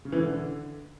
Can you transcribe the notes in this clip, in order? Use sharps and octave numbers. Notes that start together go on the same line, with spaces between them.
C#3
E3
D3